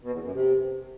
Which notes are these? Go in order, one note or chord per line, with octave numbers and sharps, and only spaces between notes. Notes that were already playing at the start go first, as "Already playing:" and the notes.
B2
E2
F#2
C3